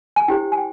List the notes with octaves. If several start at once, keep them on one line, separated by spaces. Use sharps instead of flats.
G#5
E4 G4 C5 G5
G#5
G5